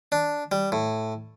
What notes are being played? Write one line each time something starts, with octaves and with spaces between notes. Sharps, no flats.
D4
G3
A2